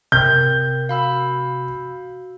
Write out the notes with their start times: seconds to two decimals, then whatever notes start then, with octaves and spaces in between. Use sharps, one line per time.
0.12 C3 A#4 G5 G6
0.89 F#4 F5 B5 E6